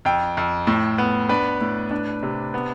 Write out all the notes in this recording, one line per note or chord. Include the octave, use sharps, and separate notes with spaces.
F2 G5
F2
A2
B3
D4 B4
A2
D4
C3
B3